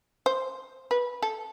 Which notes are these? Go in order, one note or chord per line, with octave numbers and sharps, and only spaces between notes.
C5
B4
A4